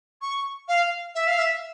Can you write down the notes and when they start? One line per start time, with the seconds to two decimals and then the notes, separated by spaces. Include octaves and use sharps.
0.22 C#6
0.68 F5
1.15 E5
1.27 F5
1.39 E5